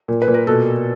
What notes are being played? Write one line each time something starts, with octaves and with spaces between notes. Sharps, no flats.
A#2
B4
A#2
A#4
B2 A4